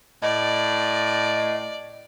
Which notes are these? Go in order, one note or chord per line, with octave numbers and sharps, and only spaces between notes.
A2 D5 D#5